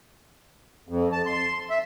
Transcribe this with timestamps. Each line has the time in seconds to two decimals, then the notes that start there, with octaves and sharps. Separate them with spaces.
0.89 F2
1.12 A5
1.26 C6
1.70 E5